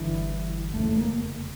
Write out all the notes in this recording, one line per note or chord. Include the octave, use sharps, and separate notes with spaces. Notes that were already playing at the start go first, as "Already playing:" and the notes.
Already playing: G1 G2 D3 E3
F1 E2 C#3 A3
A3
A#3